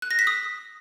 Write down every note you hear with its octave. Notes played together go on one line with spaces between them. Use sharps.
F#6
A#6
B6
D#6